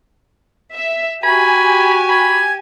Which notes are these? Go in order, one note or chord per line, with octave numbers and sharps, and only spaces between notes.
E5
F#4 G4 G#5 B5 G#6
B5 G#6